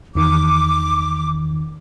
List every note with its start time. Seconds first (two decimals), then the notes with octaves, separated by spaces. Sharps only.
0.15 E2 D#3 D6